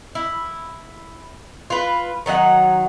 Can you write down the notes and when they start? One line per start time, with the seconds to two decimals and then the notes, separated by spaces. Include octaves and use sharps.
0.15 E4
1.70 F4 B4
2.26 D#3 F#3 D#4 F#5